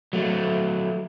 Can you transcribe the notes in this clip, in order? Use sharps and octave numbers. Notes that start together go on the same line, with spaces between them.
F#3 A3